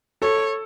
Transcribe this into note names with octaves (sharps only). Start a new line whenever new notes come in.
A4 C#5